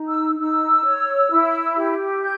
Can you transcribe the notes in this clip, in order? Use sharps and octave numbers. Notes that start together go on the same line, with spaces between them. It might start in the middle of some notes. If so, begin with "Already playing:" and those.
Already playing: D#4
E6
D#4 E6
C#5
E4
G4
G6